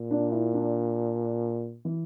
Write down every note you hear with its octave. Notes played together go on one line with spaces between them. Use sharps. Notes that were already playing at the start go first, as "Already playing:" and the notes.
Already playing: A#2
D4
E4
D4
E3